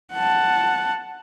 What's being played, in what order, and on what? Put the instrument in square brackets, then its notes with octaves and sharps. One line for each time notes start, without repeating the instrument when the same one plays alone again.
[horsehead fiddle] F#5 A5